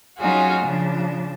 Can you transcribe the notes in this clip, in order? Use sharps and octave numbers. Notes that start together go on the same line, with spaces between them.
F#3 C#4 D#4 F4 F#4 G#4
C#3 F3 D4